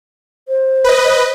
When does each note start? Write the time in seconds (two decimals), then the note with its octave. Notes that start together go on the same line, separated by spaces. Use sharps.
0.48 C5
0.84 B4 D#5